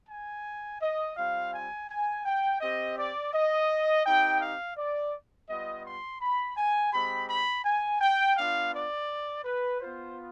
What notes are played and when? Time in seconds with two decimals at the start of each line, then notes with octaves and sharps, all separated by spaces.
0.09 G#5
0.81 D#5
1.17 G3 C4 F4 F5
1.53 G#5
1.89 G#5
2.25 G5
2.60 C4 G4 D#5
2.97 D5
3.33 D#5
4.04 C4 D#4 G4 G5
4.41 F5
4.77 D5
5.49 G3 B3 F4 D#5
5.86 C6
6.21 B5
6.57 G#5
6.93 G#3 C4 G4 B5
7.28 B5
7.64 G#5
8.01 G5
8.37 B3 D4 F4 F5
8.73 D5
9.45 B4
9.81 B3 F4 C5